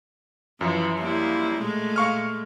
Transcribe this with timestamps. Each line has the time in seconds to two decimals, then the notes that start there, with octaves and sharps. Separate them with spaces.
0.61 F#2 E3 F3
1.01 G3 A#3 E4
1.58 A#2 G#3 A3
1.96 F5 C#6 F6